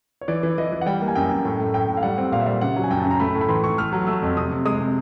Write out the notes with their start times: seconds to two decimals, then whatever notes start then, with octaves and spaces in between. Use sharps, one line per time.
0.21 C#5
0.28 E3 D5
0.43 E3
0.58 E3 D#5
0.72 E3
0.81 F#5
0.86 G3 G5
1.01 A#3
1.08 G#5
1.15 F#2 G5
1.31 F#2
1.45 A2
1.60 A3
1.74 A2 G5
1.88 A2
1.97 F5
2.03 G3 F#5
2.18 C4
2.32 A#2 F5
2.40 E5
2.46 G3 F5
2.61 C#3 F#5
2.76 F#3
2.84 G#5
2.91 F#2 G5
3.00 A5
3.06 C#3 A#5
3.20 A3 B5
3.35 A2
3.41 B5
3.48 E3 C6
3.63 E3 C#6
3.78 A3 F6
3.93 F#3
4.07 A3 E6
4.22 F2
4.37 C3 D#6
4.51 C3
4.65 G#3 D#6
4.81 C3